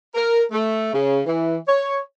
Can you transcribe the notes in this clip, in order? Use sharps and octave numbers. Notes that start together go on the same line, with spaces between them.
A#4
A3
C#3
E3
C#5